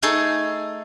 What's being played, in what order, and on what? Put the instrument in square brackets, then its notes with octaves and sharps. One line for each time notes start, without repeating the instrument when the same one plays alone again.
[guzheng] A3 D#4 G#4 A4